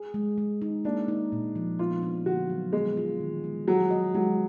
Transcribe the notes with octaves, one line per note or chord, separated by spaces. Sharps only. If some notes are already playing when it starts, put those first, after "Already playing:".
Already playing: G#4
G#3
G#3
D#4
A#3 D4
D#4
A#2
F3
B3 F4
D4
D3 F#4
F#3
G#3 B3
F4
D#3
G#3
F#3 G#4
D#5
F#3 G#3